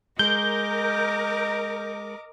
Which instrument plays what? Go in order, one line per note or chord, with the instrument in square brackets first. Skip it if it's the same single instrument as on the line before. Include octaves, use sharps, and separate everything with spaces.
[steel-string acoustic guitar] G#3 [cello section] A#4 [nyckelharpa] D#5 D6 [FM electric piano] G6